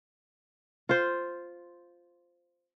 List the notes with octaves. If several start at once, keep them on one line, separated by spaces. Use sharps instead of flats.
F4 C5